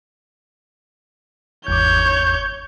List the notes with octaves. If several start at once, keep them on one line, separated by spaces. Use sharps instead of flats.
G#1 E2 C#5 D6 G6